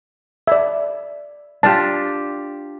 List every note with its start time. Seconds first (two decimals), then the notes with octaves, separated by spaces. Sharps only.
0.47 D5 E5
1.63 D4 F4 G4 A5